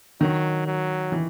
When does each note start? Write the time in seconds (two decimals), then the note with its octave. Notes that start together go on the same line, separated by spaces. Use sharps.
0.21 D#3 F#3
0.66 F#3
1.12 E3